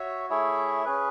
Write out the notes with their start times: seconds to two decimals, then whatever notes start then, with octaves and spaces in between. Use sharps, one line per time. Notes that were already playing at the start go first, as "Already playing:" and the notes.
Already playing: F#4 C#5 E5
0.30 A3 E4 G#4 C#5 E5
0.85 C#4 G#4 B4